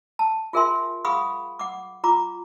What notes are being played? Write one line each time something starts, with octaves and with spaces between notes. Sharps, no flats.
A5
F4 G#4 A#4 E5 G#5 C6
G#4 F5 F#5 B5 C#6 D#6
F#5 D6
F4 A#5 D6